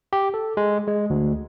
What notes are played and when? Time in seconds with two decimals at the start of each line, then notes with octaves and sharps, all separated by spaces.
0.13 G4
0.34 A4
0.57 G#3
0.87 G#3
1.10 D2